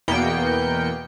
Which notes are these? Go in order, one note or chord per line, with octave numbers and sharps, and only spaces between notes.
E2 B2 A#3 B3 G5 C#7